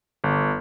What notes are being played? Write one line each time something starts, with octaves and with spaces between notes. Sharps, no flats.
G1